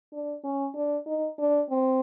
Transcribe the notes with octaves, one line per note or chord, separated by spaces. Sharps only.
D4
C#4
D4
D#4
D4
C4